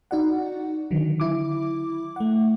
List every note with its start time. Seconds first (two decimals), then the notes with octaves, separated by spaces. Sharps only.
0.11 D#4 F#4 D5 F#5
0.91 D3 D#3 F#3
1.20 E4 D6
2.16 A3 F#5